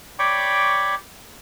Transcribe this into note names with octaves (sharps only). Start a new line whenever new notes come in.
C#5 D5 G5 B5 C#6 D6